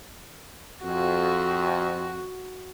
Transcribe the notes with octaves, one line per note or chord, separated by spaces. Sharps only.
F2 F#4